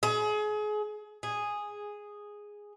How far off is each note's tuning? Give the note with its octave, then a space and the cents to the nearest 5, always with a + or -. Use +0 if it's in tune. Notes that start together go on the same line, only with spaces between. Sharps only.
G#4 +30
G#4 -5